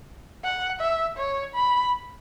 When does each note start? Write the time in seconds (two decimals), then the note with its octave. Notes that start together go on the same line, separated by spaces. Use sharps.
0.44 F#5
0.80 E5
1.17 C#5
1.55 B5